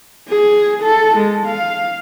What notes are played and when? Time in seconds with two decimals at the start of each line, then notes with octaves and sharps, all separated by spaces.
0.29 G#4
0.83 A4
1.17 G#3
1.46 F5